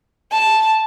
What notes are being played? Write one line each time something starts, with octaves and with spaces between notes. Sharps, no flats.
A5